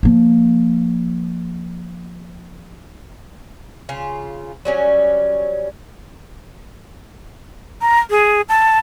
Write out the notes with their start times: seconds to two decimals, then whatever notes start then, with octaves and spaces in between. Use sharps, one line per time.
0.03 F3 A#3
3.89 C#3 F4
4.65 F#3 G3 C#4
7.81 A#5
8.10 G#4
8.49 A5